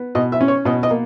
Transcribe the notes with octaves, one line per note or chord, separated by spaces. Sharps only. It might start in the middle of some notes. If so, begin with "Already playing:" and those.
Already playing: B3
B2 D#5
E5
C#4
C#5
B2 D#5
D#5
A#3